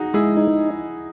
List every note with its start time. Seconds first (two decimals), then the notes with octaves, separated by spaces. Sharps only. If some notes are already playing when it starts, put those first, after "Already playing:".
Already playing: D#4 F#4 G#4
0.14 G#3 E4 G#4
0.37 D#4